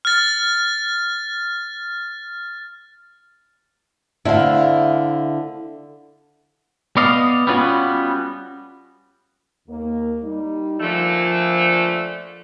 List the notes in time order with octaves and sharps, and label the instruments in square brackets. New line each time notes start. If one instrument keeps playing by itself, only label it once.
[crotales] F6 A6
[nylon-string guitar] D3 A3 C4 [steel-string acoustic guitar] E4 F5
[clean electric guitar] B3 D5 D#5 F5
G3 B3 C#4 F4 F#4
[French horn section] D#2 A#3
G3 D#4
[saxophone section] A#2 D3 A3 [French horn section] F3